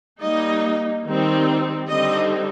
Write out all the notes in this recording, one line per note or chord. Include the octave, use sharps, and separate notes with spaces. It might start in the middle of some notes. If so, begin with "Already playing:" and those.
G3 A#3 D#4 D#5
D#3 G3 C4 D#4
D3 G3 C4 D#4 D#5